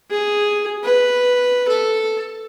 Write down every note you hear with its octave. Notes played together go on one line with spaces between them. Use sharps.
G#4
B4
A4